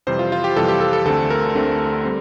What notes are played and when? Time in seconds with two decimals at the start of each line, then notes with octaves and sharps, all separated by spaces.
0.07 F2 C3 E3 G3 C5
0.19 F4
0.32 F4
0.44 G4
0.56 F2 C3 E3 G3 A4
0.68 G4
0.81 A4
0.93 A4
1.05 D2 D3 A3 C4 A4
1.30 A#4
1.55 D2 D3 A3 C4
2.05 G3 C4